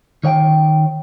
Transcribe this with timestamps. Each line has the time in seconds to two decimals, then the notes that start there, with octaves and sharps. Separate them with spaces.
0.24 D#3 C#5 F5 G5